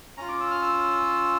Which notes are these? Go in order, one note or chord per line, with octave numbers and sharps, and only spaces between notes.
C#4 F4 A#5
D6
E6
F6
E6